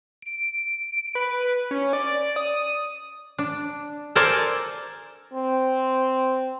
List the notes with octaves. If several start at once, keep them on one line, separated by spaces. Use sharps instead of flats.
D7
B4
C#4
D5
D#6
D4
A4 A#4 C5 D5 G#5 A5
C4